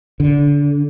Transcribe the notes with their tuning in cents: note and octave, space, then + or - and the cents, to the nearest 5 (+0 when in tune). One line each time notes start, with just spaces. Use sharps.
D3 -25